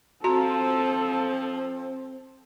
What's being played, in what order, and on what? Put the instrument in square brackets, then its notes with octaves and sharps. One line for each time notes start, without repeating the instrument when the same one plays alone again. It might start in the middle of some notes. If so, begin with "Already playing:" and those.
[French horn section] F3 [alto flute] C4 [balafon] F#4 A#5 [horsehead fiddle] A4